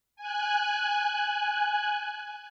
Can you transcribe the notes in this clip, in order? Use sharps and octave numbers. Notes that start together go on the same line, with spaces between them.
G#5 F#6